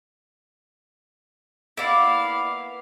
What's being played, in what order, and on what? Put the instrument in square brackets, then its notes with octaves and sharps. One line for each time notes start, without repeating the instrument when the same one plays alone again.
[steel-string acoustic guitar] A#3 B3 [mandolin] E4 D5 [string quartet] F5